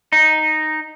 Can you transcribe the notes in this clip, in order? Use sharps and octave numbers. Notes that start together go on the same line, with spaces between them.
D#4